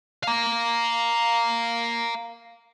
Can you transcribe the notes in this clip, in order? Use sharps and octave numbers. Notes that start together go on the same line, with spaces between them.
F5 A#5